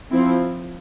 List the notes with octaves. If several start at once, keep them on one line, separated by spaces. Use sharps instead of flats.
F3 C4 E4